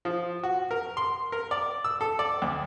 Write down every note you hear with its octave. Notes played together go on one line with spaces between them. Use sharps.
F3
F#4
A#4
C6
A#4
D5
E6
A4
D5
D2